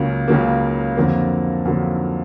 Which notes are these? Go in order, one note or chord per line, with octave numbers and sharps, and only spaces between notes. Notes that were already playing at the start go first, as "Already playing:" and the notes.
Already playing: C#2 C#3 F#3 A#3
C#2 C#3 F#3 A#3
F2 D3 F#3 A#3
F2 D3 F#3 A#3